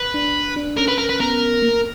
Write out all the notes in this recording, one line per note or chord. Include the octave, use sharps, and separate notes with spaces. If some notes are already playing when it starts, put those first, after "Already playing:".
Already playing: B4
D4
D4
C#4 A#4
B4
A#4
B4
B3 A#4
A#3